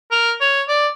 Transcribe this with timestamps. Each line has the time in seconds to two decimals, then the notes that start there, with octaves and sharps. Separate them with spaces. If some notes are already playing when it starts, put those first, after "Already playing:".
0.12 A#4
0.41 C#5
0.68 D5